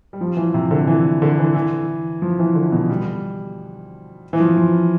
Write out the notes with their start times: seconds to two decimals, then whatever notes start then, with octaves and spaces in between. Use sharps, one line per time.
0.13 G3
0.21 F3
0.37 E3
0.54 C3
0.71 D3
0.87 E3
1.22 D3
1.39 E3
1.55 E3
2.22 F3
2.39 E3
2.55 D3
2.72 B2
2.89 G3
4.33 E3
4.40 F3
4.57 F3